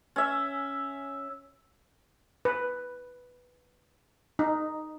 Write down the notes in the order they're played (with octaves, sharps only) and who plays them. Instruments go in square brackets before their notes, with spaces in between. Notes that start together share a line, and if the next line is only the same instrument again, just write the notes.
[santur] C#4 E5
[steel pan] B4
D#4